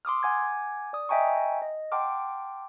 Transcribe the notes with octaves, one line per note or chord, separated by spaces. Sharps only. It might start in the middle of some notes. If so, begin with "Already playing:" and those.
C6 D6 D#6 F6
F#5 G#5 D6 G#6
D5 D#6
D#5 E5 G5 G#5 A#5 C#6
D#5
F#5 G5 A5 C6 D6 F6